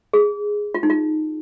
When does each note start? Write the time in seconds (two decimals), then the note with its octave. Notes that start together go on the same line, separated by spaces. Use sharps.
0.13 G#4
0.74 F4
0.83 D#4
0.90 F4